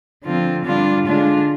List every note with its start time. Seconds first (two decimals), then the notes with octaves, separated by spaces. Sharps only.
0.23 D3 F3 C4 F4
0.64 D3 G3 D4 F4
1.06 D3 G#3 D4 F4